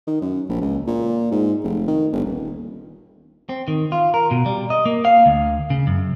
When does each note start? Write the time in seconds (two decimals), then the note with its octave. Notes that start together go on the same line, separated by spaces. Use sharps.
0.07 D#3
0.21 F#2
0.49 A#1
0.61 C#2
0.87 A#2
1.31 G#2
1.64 F1
1.88 D#3
2.12 G1
2.25 D#1
3.49 C4
3.68 D#3
3.92 F4
4.14 A#4
4.31 B2
4.46 G3
4.70 D#5
4.86 A#3
5.05 F5
5.26 D2
5.70 C#3
5.87 F#2